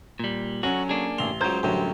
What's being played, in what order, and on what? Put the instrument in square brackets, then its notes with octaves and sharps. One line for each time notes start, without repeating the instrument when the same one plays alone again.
[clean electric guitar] A#2 G3
[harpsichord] D3 [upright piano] F#3 C#4 [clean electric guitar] F#4
[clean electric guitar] A#3 D4 G#4
[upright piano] A1 F7 [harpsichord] C6
[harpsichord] C#2 F#3 [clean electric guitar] C5 [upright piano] A#5 G6 G#6
[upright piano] A1 D3 F#3 [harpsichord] F#2 G3